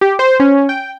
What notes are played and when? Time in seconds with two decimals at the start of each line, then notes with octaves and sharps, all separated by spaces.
0.01 G4
0.19 C5
0.40 C#4
0.69 G5